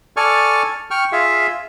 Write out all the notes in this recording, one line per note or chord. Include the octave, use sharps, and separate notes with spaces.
A4 D5 G#5 C#6 F6
G5 C#6 F6
F4 G#4 E5 F5